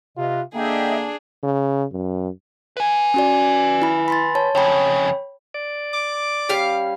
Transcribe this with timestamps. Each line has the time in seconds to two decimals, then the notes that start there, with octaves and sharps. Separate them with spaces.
0.17 C3 F4 B4 D#5
0.54 D3 A#3 D4 G#4 D#5 E5 G5
1.43 C#3
1.92 F#2
2.77 B4 G#5
3.14 C#4 F#4 D5
3.82 E4 B5
4.08 B5 C6 A6
4.35 C#5 A5
4.55 F2 C#3 C#5 G5 B5
5.54 D5
5.94 D6
6.49 G3 C#4 F5